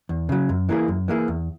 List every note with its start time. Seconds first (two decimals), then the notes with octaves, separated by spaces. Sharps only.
0.09 E2
0.29 C#3 F#3
0.49 F#2
0.69 E3 A#3 E4 G#4
0.88 F#2
1.08 E3 A#3 E4 G#4
1.28 E2